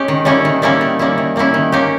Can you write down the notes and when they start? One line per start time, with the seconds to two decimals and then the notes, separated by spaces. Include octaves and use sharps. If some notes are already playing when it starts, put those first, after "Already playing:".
Already playing: G#3 C#4 G4
0.08 D#3
0.25 G3 A#3 C#4 E4
0.45 D#3
0.62 G3 A#3 C#4 E4
0.81 D#3
0.99 G3 A#3 C#4 E4
1.18 D#3
1.36 G3 A#3 C#4 E4
1.54 D#3
1.72 A#3 C#4 G4